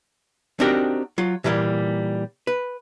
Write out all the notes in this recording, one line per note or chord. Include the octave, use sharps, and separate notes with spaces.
C4 D4 D#4 F#4 G4 A#4
F#3 F4
A#2 E3 G3 A3 A#3
B4